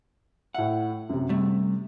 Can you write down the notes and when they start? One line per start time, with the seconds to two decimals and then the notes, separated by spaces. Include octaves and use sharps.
0.55 A2 E5 F#5
1.09 F#2 C3
1.29 C3 G3 A3